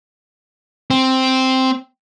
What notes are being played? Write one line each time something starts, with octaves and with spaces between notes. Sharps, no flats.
C4